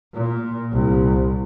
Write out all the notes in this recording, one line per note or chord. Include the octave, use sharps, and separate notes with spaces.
A#2
C2